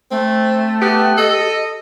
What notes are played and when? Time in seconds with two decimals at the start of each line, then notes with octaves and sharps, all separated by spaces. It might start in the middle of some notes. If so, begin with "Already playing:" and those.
0.11 A3 C4
0.82 B3 G4
1.17 A4 D#5